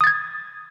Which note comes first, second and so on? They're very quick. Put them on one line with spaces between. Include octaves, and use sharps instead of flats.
D#6 A6 G#6